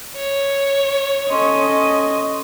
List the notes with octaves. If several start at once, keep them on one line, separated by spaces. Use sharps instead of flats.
C#5
C#4 A4 D#5 C6 C#6